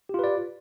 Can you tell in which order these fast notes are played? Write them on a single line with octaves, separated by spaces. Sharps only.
G4 F4 B4 D5